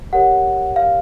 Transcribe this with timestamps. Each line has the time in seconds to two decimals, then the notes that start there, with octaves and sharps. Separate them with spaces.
0.13 G4 A#4 C#5 F#5
0.76 F5